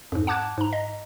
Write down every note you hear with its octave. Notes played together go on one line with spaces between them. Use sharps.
F2 G#2
F#5 A5 D6 F#6 G#6
G#2 A#5
D#5